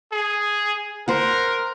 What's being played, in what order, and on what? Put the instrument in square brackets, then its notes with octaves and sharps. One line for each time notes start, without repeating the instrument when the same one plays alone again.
[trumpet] G#4
[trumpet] A#4 [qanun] C5 F#5